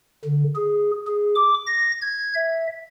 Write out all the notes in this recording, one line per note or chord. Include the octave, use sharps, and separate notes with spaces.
D3
G#4
G#4
D6
A#6
G#6
E5